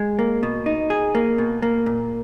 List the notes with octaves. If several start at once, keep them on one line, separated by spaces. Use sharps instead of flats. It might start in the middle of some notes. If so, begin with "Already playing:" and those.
Already playing: G#3
A#3
B2
D#4
G#4
A#3
B2
A#3
A#2